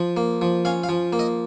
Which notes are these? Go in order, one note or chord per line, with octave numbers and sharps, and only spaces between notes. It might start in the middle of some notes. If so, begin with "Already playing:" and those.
Already playing: F3
A#3
F3
C#4 F5
F5
F3
A#3
D#5